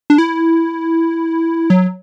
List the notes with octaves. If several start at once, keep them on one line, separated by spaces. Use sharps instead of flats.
D4
E4
F#3